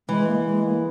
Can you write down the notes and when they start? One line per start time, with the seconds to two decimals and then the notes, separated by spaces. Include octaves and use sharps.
0.08 E3 G#3
0.27 A#3
0.45 G#3
0.65 A#3